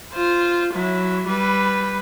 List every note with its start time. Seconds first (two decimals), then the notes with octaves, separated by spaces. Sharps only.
0.13 F4 C5
0.74 F#3 E4
1.27 G3 B4